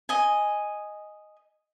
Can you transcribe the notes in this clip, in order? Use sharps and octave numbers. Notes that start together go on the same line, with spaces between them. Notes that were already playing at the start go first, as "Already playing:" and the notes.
D#5 G#5